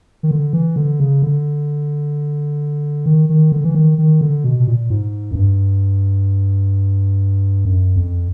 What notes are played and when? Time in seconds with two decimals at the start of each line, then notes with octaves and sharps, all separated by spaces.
0.23 D#3
0.31 D3
0.53 E3
0.76 D3
1.00 C#3
1.22 D3
3.06 D#3
3.29 D#3
3.52 D3
3.64 E3
3.75 D#3
3.98 D#3
4.21 D3
4.44 B2
4.60 B2
4.67 A#2
4.90 G#2
5.31 F#2
5.35 G2
7.65 F#2
7.96 F2